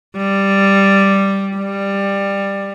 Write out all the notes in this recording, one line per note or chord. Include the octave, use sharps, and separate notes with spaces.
G3
G3